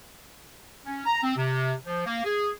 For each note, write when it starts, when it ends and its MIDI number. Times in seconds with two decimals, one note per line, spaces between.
0.85 1.01 61
1.05 1.21 82
1.22 1.34 60
1.36 1.73 48
1.85 2.02 53
2.05 2.21 58
2.24 2.49 68